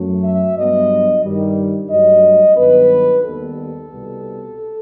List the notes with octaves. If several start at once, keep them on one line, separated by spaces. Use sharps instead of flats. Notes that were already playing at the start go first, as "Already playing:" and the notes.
Already playing: F#2 F#3 A3
E5
G2 F#3 B3 D#5
G2 D#3 G3
G2 F#3 A3 D#5
G2 D#3 F#3 B3 B4
D#2 D#3 G3 B3 A4
C2 B2 G3 B3